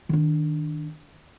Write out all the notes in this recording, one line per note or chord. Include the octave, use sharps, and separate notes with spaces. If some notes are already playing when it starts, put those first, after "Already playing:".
D#3 D4